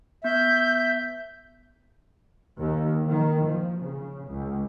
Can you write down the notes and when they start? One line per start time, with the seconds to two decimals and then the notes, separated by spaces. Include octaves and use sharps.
0.24 B3 E5 G6
2.60 D#2
3.08 D#3
3.45 F3
3.81 C#3
4.30 C#2